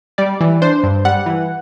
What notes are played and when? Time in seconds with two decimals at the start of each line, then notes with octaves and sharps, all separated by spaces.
0.18 G3 D5
0.41 E3
0.62 D4 C5
0.84 G2
1.05 G3 F#5
1.26 E3